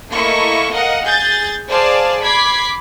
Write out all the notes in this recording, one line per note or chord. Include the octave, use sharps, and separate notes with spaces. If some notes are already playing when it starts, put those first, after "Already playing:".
A3 A#3 E4 D#5 C#6
A#4 D#5 F5 F#5
G#4 G6 A6
G#4 C5 D5 F5 A5
B5 D6 G#6 B6 C7